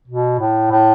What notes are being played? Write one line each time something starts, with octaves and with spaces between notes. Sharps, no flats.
B2
A2
A2